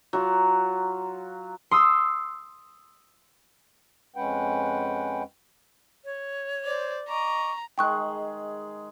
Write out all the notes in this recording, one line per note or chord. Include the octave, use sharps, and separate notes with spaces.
F#3 F4
C6 D#6 E6
F2 G#3 C#4 B4 F#5 G5
C#5
C5 D5
D#5 A#5 C#6 D6
D#3 G#3 G#4 G5 C#6 F#6